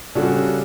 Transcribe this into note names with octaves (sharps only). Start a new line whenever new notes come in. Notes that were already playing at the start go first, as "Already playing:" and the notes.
C#3 G3 D4 F#4 A4